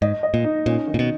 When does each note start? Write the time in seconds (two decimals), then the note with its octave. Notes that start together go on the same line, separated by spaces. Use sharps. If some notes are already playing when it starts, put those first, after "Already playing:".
0.02 G#2 D#5
0.23 D#5
0.34 A#2
0.44 D#4
0.66 A#2 C#4
0.87 D#3
0.94 A#2
0.99 B2